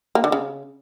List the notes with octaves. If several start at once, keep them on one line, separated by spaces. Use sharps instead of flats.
A#3
D3
C#3